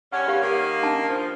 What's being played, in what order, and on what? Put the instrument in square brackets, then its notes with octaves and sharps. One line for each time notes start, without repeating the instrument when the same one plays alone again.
[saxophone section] G2 C#4 [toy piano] F#5
[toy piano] G4 F5
[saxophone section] D#3 A#3
[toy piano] C#4 D4 A5
[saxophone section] F3